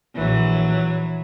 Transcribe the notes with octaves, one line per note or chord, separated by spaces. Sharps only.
A#1 E3 F#3